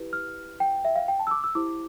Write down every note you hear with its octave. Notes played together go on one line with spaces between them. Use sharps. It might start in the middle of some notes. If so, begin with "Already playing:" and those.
Already playing: E4 G4 B4
F6
G5
E5
F5
G5
A5
E6
D6
E6
E4 G4 C5 D6